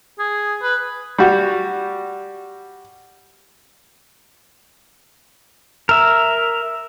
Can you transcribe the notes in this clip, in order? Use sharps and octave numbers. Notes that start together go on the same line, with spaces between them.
G#4
B4
G3 F#4
A#4 E5